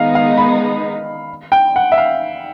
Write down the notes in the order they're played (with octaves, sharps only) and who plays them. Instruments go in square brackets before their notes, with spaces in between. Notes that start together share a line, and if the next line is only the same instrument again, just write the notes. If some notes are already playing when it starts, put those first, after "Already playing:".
Already playing: [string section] D#3 G#3 B3 D#4 [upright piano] F5
[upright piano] F5
B5
G5
F#5
E5
F5